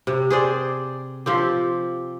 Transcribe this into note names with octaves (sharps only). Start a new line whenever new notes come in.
C3
G#4 C5 D5
F3 C4 G4